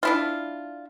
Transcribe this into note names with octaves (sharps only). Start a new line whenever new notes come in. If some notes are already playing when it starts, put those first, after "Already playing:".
D4 E4 F4